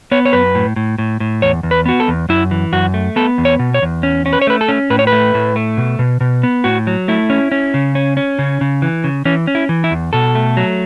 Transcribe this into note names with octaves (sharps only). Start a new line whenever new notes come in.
B3 C#5
C#5
F#2 B4
A2
A2
A2
A2
E2 C#5
E2
B4
B3 F#4
A4
E2
F#2 E4
E3
F#2 F#4
A3
B3 A4
E2
C#5
B2
C#5
E2
C#4
C#4
B4
C#5
A3 B4
A4
C#4
A2 B4
C#5
B4
A3
A2
A3
B2
B2
B2
B3
A2 F#4
F#3
A3 E4
C#4
C#4
C#3
C#4
C#4
C#3
C#3
E3
C#3
E3 C#4
C#4
E4
E3
E4
E2
B2 A4
A3
F#3